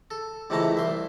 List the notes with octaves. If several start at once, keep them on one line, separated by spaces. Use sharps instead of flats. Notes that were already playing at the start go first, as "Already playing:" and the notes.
A4
C#2 C3 E3 A3 A5 A#5
C2 E5 C6